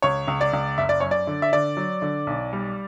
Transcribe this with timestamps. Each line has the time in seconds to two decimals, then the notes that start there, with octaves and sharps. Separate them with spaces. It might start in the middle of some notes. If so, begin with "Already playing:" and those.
0.02 C#2 C#5
0.28 C#2
0.41 D5
0.53 C#2
0.78 F#1 E5
0.89 D5
1.00 F#2 C#5
1.11 D5
1.27 D3
1.42 E5
1.53 D3 D5
1.77 F#3
2.02 D3
2.27 B1
2.53 G3